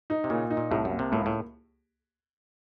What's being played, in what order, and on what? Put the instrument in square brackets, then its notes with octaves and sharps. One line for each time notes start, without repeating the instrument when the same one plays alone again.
[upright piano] D#4
[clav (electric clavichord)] C3
[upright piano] A#2 [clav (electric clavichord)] C#3
[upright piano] D#4
[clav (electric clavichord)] A#2
[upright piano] C2 [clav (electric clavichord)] A2
[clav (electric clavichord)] F#2
[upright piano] A#3
[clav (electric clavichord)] C3
[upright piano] C#2 [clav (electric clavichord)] A2
[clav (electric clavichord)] A2